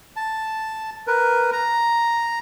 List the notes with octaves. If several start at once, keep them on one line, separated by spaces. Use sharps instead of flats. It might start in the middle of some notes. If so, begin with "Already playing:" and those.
A5
A#4 B4
A#5